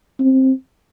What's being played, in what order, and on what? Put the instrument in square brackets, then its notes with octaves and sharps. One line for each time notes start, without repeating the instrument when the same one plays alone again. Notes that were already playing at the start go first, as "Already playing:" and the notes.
[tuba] C4